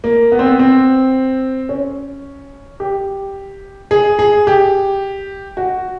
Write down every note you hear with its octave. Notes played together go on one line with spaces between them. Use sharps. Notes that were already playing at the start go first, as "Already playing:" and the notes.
A#3
B3
C4
B3
C4
C#4
G4
G#4
G#4
G4
F#4